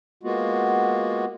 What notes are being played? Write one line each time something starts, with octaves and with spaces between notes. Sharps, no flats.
G#3 A#3 B3 F4 F#4